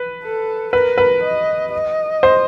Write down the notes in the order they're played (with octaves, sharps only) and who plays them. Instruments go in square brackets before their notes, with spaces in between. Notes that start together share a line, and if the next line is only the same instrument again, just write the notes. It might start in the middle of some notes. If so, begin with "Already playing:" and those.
Already playing: [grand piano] B4
[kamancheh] A4
[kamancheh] A#4 [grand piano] B4
[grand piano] B4
[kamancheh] D#5
D#5
[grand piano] C5